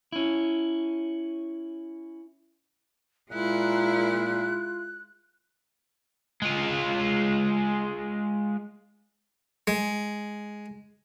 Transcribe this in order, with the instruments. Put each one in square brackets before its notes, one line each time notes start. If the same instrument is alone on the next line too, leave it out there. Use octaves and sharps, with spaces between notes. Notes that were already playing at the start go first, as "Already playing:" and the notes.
[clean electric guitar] C#4 E4
[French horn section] A#2 [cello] G#3 E4 [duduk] F4 [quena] F#6
[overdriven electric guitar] G#3 F4
[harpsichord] G#3